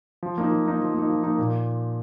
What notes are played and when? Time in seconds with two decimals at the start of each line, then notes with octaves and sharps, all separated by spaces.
0.23 F3
0.38 A#3 D#4
0.51 F3
0.66 A#3 D#4
0.81 F3
0.94 A#3 D#4
1.09 F3
1.24 A#3 D#4
1.38 A#2